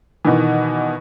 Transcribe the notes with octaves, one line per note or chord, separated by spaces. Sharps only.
B2 D#3 E3